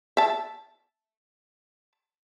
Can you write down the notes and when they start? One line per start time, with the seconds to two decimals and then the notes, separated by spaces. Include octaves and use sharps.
0.17 E5 A5